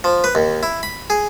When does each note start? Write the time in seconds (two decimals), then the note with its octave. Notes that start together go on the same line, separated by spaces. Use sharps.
0.04 F3
0.24 B4
0.35 D#2
0.63 E4
0.83 B5
1.10 G#4